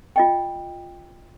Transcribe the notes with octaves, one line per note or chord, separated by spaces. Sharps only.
F4 D#5 G5